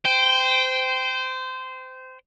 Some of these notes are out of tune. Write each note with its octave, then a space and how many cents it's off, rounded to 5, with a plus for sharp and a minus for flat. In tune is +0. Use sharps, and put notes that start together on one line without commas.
C5 -20 G5 +0